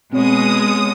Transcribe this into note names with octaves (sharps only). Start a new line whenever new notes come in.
B2 G#3 C4 C#5 D#6